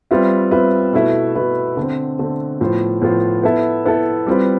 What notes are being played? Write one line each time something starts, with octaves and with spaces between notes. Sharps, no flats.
G3 C4 F4 B4 E5
G3 C4 F4 B4 E5
B2 A3 E4 B4 E5
B2 A3 E4 B4 E5
D3 A3 C4
D3 A3 C4
A2 F3 B3 F4 C5
A2 F3 B3 F4 C5
B3 E4 A4 E5
B3 E4 A4 E5
G3 C4 F4 B4